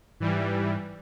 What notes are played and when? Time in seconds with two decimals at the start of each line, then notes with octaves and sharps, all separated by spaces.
0.20 G#2 E3 G3